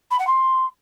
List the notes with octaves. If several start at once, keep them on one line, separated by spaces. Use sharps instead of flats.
B5
F#5
C6